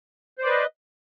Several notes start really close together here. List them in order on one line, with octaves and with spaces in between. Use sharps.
C5 D5 B4 D#5